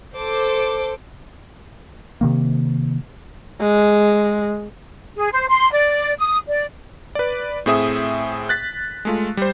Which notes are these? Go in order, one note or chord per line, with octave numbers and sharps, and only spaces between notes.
A4 C5 D6
C3 D#3 A#3
G#3
G#4
C5
C6
D5
D#6
D5
B4 D5
A2 C4 G#4 E5 D#6
F#6 A6 B6
G#3 A3 F4
G3 C5